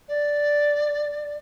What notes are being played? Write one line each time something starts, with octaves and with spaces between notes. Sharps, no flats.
D5